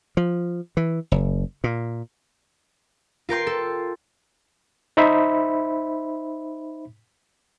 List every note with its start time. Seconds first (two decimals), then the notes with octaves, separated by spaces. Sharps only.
0.17 F3
0.77 E3
1.12 F#1
1.64 A#2
3.29 F4 A#4 G5 C6
3.47 A4
4.97 D#4 C5 E5 B5